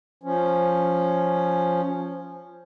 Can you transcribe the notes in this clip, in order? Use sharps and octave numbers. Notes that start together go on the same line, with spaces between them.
F3 C#4